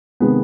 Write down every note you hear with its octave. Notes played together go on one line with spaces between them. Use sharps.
C3 D#3 G#3 B3